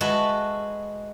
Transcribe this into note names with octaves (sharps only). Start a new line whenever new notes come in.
G#3 F#4 A4 B4 E5